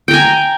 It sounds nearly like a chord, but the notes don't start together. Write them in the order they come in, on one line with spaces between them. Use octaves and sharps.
G5 A#5 G#5